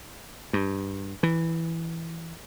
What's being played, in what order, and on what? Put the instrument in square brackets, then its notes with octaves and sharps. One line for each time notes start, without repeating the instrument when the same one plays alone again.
[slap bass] G2
E3